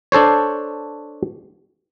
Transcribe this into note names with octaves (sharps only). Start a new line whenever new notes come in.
D4 A4 C5 C#5